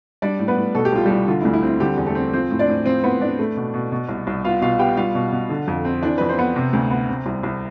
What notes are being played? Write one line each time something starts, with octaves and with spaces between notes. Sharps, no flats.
G3 D4 D5
A2
B3 B4
A2
B2 A4
G4
C2 F4
C2 G3 G4
D3 F4
E4
D2
E4
C4
E4
D3 G3 G4
E2
A3 A4
C4
F3 C4 C5
A2
D4 D5
A2
F3 C4 C5
A2 B3 B4
A2 D4 D5
A3
B2
B2
B2
C2
C2
B3 F4 F5
B2 F4 F5
B3 G4 G5
G3 F4 F5
B2
B2
D3
F2
C4
E3 D4 D5
F2 B4
C4 C5
B3
C3
D2
B3
C3
C2
C2